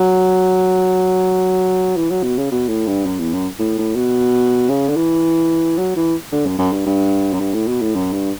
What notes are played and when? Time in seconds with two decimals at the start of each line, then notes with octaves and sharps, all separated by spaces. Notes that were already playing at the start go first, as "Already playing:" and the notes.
Already playing: F#3
1.96 E3
2.11 F#3
2.23 B2
2.38 C#3
2.51 B2
2.69 A2
2.87 G2
3.06 F#2
3.19 E2
3.33 F#2
3.59 A2
3.78 A2
3.96 B2
4.69 C#3
4.89 D3
4.96 E3
5.78 F#3
5.96 E3
6.32 D3
6.46 F#2
6.59 F#2
6.73 G2
6.86 G2
7.33 F#2
7.40 G2
7.54 A2
7.68 B2
7.82 A2
7.95 F#2
8.13 G2